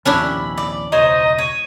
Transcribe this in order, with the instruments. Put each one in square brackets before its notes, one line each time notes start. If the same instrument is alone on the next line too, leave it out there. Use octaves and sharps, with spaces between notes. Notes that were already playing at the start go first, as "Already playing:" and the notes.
[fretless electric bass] A#1 D#2 C3 [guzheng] C#4 D4 E4 [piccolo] B5
[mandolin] D5
[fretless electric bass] E1 C#2 [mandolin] D#4 C5 C#5 [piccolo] D#5
[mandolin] C#5 [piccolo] D#7